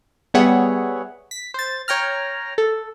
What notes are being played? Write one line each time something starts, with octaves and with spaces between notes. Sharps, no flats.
G3 B3 G#4 C#5 E5 F#5
B6
C5 A6
C#5 G5 A#5 F6
A4